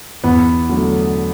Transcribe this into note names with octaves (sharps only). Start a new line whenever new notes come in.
E2 B3
D3 F#3 A3